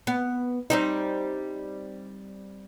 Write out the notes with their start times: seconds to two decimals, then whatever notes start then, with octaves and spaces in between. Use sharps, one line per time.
0.07 B3
0.70 G3 C4 D#4